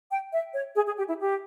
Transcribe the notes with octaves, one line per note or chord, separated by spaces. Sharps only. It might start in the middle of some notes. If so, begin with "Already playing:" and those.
G5
E5
C#5
G#4
G#4
G4
E4
G4